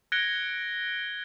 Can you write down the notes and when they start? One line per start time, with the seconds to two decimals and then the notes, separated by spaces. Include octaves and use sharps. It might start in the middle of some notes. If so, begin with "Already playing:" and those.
0.12 F#6 G#6 A#6 C#7 D7 G7